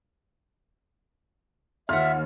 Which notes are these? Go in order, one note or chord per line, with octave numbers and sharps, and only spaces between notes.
D#2 F4 E5 F#5 F6